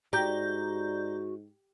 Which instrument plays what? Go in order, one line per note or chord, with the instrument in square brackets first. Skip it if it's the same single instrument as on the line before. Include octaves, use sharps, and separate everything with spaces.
[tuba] G#2 [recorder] F#4 [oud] G4 [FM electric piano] D5 A#5 G6